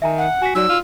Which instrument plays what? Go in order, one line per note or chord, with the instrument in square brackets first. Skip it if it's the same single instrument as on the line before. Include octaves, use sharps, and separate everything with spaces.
[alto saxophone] D#3 [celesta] E5 G#5 A#5
[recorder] F#5
[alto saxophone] F#4 [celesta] G#5 B6
[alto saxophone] F#3 [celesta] D#4 F#4 D5 [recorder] E6
[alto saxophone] F4